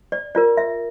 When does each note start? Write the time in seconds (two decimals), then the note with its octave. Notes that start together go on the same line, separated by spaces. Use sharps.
0.12 D5
0.35 F4 A#4 D5
0.57 E5